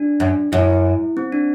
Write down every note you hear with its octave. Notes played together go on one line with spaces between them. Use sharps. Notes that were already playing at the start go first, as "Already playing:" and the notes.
Already playing: D4
F#2
F#2 E4
C4
D4